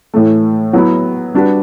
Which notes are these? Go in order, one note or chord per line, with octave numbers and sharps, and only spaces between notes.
A2 E3 A3
F#3 B3 E4
G3 D4 F#4 B4